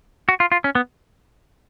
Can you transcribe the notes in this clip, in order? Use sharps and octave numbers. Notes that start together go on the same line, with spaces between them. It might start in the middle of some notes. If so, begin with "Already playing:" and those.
F#4
F4
F4
C#4
B3